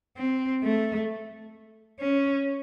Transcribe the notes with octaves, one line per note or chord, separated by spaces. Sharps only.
C4
A3
C#4